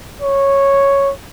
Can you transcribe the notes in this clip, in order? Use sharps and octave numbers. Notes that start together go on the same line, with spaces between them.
C#5